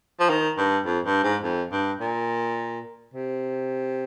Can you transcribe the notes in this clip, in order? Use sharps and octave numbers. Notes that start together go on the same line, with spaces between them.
F3
D#3
G2
F2
G2
G#2
F2
G2
A#2
C3